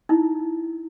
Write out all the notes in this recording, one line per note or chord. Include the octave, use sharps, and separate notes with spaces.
D#4 E4